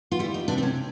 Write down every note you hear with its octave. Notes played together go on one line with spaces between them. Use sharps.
F4
G3 E4
D#4
C3 D4
C4
C#4